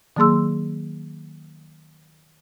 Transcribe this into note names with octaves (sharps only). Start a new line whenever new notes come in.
D#3 F#3 A#3 G#4 C6 E6